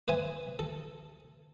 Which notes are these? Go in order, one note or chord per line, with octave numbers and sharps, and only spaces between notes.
B4 C5 E5 G#5
A4